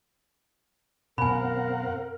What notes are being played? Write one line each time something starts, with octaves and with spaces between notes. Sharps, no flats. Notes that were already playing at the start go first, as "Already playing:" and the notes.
F#2 B2 C4 A#4 F5 F#5 G#5 B5